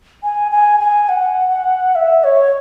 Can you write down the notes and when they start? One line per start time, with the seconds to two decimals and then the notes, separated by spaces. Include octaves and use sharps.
0.23 G#5
0.51 G#5
0.80 G#5
1.09 F#5
1.95 E5
2.24 C#5